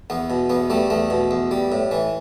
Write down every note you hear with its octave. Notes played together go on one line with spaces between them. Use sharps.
E2 B3
B2
E2 B3
G3 A3
E2 A3
B2
E2
G3
A2
E3